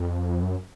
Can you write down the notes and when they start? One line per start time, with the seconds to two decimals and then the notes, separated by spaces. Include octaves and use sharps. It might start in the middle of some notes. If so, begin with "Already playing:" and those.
Already playing: F2
0.43 F#2